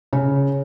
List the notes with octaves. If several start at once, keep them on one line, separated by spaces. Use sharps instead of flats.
C#3